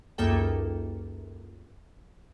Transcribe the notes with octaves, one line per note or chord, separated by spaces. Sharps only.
C#2 F#2 A#3 D#4 A4 G5